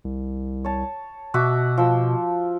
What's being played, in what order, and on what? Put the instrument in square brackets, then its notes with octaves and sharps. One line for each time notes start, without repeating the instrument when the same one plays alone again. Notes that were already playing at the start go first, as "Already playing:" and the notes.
[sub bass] C2
[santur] C#5 A5
[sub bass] B2 [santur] F#4 E5 D6
[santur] F3 E6